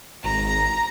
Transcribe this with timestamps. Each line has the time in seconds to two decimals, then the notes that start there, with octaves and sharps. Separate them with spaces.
0.24 G#1 A#5